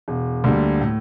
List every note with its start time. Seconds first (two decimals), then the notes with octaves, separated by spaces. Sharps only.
0.08 E1
0.44 D2 D3 G3 A#3
0.81 A2